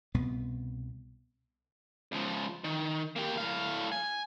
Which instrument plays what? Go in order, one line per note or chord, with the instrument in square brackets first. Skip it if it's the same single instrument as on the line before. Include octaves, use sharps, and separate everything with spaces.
[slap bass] C2 B2 B3
[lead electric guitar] C#2 F3
D#3
A#3 G4
A2 F5
G#5